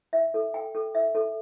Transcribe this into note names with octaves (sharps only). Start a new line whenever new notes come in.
E5
A4
G5
A4
E5
A4